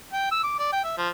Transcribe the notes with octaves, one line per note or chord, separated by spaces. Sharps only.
G5
E6
D6
D5
G5
E5
F3